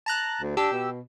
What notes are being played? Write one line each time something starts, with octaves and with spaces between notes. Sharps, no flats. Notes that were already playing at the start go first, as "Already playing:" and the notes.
A5 A#5 F#6
D2
D4 G4 E6
B2